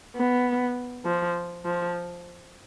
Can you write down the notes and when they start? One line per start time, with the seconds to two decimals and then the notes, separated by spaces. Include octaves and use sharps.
0.16 B3
1.05 F3
1.65 F3